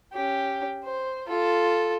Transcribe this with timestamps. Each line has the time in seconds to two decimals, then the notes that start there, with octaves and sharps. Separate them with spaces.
0.13 C#4 G4
0.84 C5
1.28 F4 A4